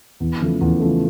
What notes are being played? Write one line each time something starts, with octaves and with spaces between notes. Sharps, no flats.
E2
C#3 F3 A3
E2
C#3 F3 A3